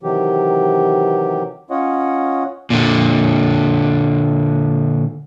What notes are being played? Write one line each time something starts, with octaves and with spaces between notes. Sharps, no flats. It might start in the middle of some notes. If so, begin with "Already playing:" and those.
C3 D#3 E3 F#3 G4
C#4 F4 C#5 D#5 F#5
A#2 D3